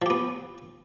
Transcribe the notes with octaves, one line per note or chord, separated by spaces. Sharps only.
F3 B3 G4